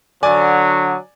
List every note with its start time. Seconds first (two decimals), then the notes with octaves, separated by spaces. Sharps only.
0.23 D3 F#3 D5 G#5